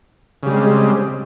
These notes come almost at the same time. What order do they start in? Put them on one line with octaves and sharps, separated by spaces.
C#3 G3 G#3 C4